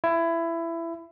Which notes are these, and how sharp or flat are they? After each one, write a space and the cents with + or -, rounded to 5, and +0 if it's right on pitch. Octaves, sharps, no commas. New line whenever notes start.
E4 +20